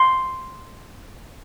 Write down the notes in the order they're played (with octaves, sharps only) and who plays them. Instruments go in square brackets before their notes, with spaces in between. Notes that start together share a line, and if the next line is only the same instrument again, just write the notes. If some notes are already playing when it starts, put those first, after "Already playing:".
Already playing: [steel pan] C6